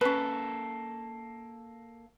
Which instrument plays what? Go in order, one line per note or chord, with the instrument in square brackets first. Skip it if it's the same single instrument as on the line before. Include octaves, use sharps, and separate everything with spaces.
[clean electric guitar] A#3 A4 [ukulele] C#4 B4